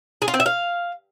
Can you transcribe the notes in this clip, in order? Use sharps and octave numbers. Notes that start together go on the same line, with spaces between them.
G#4
F4
C4
E5
F5